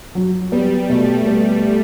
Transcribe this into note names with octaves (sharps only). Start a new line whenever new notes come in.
F#3
G3 B3
B2 A3
B3